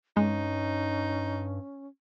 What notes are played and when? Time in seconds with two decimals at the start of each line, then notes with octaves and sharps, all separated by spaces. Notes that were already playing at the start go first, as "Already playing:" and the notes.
0.17 G2 G#3 C#4 D#4